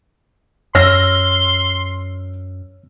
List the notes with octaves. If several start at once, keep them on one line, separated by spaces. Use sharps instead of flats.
F#2 C#5 C6 E6 F6 A#6